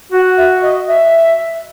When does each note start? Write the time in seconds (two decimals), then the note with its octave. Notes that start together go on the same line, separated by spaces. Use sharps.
0.12 F#4 F#5
0.37 E5
0.62 D#5
0.88 E5